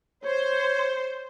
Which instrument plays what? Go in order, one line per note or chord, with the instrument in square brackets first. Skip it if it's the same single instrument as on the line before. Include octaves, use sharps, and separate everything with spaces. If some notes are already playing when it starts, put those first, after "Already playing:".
[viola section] C5 [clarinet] C#5